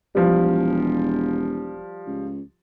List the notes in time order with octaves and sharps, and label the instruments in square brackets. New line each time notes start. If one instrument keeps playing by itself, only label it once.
[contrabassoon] E1 [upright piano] F3 G3
[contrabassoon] C#2